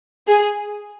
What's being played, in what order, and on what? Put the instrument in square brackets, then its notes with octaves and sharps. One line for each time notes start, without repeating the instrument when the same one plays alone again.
[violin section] G#4